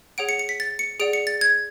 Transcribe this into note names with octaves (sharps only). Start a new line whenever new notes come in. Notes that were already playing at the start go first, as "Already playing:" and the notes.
G#4 C#5 F#5 D7
C#7
C#7
B6
A6
C#7
G#4 D5 F#5 D7
C#7
A6
G#6